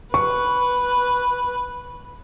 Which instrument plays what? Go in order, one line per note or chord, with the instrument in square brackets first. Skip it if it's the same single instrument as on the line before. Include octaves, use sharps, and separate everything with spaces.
[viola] B4 [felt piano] C#6